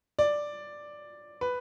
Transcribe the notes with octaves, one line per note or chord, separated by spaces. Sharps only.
D5
B4